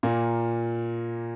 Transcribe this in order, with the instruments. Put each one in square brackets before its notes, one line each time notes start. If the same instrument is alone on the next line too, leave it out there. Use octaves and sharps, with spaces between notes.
[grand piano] A#2 A#3